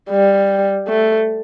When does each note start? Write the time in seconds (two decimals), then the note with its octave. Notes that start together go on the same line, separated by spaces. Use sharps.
0.10 G3
0.88 A3